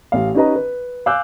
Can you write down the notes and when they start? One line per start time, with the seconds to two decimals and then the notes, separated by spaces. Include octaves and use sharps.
0.12 A1 F5
0.35 C#4 D#4 G4 B4 D#5 A#5
0.55 B4
1.06 F5 G#5 D6 E6 F#6 G6